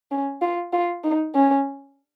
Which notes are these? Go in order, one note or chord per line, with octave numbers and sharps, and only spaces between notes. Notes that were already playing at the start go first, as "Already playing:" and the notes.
C#4
F4
F4
D#4
C#4